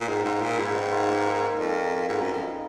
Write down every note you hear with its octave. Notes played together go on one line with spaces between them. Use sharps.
A#2
G#2 D#3
G#2 F4
A#2 A#3
G#2 B4
D#3
F4
A#3
A#4
D#4
F2 D5
A#3
A#4
G#2 B3
F#2
G#4
F2
D#4